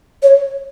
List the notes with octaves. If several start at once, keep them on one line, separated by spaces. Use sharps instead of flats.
C#5